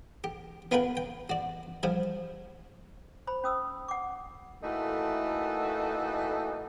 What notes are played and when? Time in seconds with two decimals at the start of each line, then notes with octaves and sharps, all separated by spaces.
0.24 G4
0.71 B3 F4 A#4 B4 G5
0.97 G5
1.30 F#4 D5
1.83 F3 G3 G#5
3.27 C5 B5
3.44 C#4 D#6 E6
3.88 F#5 D6
4.62 E3 A3 A#3 D#4 F#4 A4